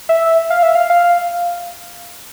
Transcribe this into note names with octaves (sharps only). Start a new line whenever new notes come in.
E5
F5
E5
F5
F5